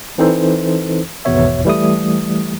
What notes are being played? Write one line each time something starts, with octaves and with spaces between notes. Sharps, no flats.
E3 C4 D#4 A4 C5
G#1 E2 B2 B3 C#5 E5
E3 G3 A3 D#6